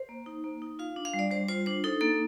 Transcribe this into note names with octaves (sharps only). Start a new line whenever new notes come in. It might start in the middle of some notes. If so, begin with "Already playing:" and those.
Already playing: C5
A#3
D#4
A#3
D#4
F4 F5
D4
F5
G3
D5
G3 C5
F4 C5
D4 C5
D#4 A4
A#3 A4